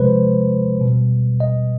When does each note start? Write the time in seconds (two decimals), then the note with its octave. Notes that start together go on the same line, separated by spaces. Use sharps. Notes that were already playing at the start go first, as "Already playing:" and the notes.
Already playing: C3 F3 G#3 B4 C5
0.81 B2 G3
1.40 D#5